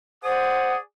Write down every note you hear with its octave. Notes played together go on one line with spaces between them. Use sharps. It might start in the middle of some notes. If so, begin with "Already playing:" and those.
G#4 C5 D5 F#5 D#6